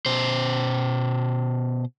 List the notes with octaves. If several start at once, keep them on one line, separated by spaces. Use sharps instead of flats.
B2 C5